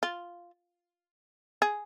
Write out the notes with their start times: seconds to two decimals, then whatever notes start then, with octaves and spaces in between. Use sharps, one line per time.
0.03 F4
1.62 G#4